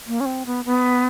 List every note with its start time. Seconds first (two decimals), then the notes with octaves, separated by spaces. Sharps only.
0.07 A#3
0.20 C#4
0.26 C4
0.46 B3
0.65 B3